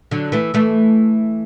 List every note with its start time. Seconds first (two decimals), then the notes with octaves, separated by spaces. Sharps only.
0.11 D3 F#3
0.32 E3 A3
0.54 E3 A3